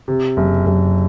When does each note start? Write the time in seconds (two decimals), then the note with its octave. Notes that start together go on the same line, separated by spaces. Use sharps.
0.08 C3
0.37 F#1
0.66 F#1